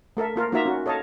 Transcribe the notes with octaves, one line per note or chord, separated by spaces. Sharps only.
A3 A4 A#4 E5
A#3 F4 A#4
A#3 D#4 F4 F#4 E5 A#5
C#4 F#4
A4 C#5 D#5 F5 A5